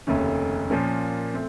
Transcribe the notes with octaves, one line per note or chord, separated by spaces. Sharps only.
F1 D#2 C#3 A3 C#4
A#2 F3 A#3 C#4
A3 C4